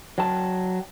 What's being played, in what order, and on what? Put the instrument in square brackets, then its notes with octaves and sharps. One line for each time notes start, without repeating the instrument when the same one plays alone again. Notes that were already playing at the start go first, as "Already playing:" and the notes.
[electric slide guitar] F#3 G5 A5